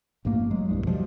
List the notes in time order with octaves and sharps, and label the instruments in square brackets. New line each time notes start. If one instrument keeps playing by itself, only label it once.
[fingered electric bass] A1 G2 A3 A#3
F#3 G#3
A#1 E2 G2
B2 F3 G3 G#3